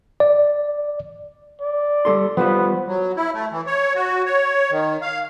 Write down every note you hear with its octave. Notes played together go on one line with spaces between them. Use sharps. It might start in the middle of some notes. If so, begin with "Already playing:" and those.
D5
D5
G3 A4 C6
F3 G3 B3 C5
F#3
E4
A3
E3
C#5
F#4
C#5
D#3
F5